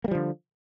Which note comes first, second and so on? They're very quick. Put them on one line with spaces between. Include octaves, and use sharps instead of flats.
A#3 G3 F3 D3